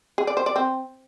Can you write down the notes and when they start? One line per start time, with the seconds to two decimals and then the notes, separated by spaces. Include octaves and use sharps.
0.18 G#4
0.27 D5
0.37 C5
0.46 D5
0.56 C4